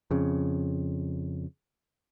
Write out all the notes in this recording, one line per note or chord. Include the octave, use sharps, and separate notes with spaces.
F2 C#3